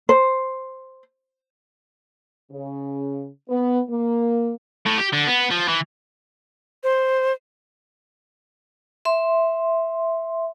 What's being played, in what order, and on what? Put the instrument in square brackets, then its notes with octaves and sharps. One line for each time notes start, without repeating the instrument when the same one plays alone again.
[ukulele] C5
[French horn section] C#3
B3
A#3
[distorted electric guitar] A2
G4
D3
B3
F3
E3
[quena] C5
[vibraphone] E5 C6